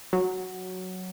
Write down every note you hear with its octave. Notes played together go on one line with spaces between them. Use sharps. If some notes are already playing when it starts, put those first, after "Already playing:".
F#3